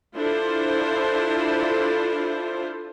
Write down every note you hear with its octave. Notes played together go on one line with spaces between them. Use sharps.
D4 E4 F4 A4 C5